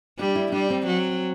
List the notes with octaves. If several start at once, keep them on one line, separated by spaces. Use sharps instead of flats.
G3 D4
E4
G3 D4
C4
F#3